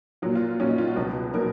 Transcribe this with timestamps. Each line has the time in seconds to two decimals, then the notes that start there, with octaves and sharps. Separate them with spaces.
0.22 A#2 F#3 F4
0.35 F4
0.59 F#3 C#4
0.63 A#2
0.69 D#4
0.78 F4
0.88 F#4
0.96 C#2 B2 F#3
1.34 B2 F#3 A#4